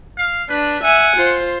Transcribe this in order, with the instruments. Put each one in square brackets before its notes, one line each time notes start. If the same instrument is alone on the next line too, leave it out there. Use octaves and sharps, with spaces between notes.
[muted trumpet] F5
[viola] D4 [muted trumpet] B4
[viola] E5 G#5 [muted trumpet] F#5
[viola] F4 C5